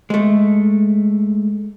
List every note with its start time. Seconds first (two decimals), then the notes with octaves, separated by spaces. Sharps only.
0.10 G#3 A3